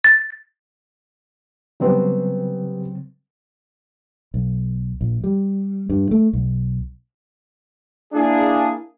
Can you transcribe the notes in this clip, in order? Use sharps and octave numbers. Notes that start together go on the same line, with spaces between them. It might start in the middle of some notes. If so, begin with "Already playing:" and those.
A6
C#3 F#3 G3 B3 C4 B4
B1
A#1
G3
G2
A3
B1
A#3 D4 E4 G#4